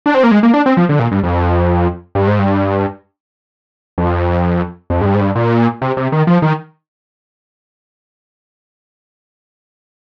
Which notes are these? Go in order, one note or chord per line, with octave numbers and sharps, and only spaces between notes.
D4
C4
A#3
G#3
A#3
D4
C4
F3
D3
A#2
G2
F2
G2
G#2
G2
F2
F2
G#2
G2
G#2
G2
A#2
C3
C3
D#3
F3
D#3